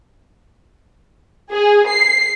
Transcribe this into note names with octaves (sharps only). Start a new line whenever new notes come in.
G#4
C7